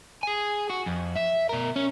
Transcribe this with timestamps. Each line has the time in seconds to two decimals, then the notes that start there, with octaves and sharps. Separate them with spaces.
0.23 G#4 G#5
0.70 F#4
0.87 F2
1.16 E5
1.49 B2 A#4
1.76 C#4